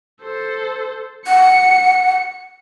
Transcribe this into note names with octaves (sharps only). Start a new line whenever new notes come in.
A4 C5
F#5 C#7